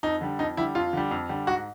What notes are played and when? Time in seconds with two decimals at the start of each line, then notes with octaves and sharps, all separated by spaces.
0.03 F2 D#4
0.21 D3 G3
0.39 F2 D#4
0.57 D3 G3 E4
0.75 F2 F4
0.93 D3 G3
1.11 F2
1.29 D3 G3
1.47 G#2 F#4